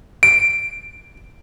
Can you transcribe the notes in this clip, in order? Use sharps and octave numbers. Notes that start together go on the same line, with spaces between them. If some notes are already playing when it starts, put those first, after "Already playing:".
D7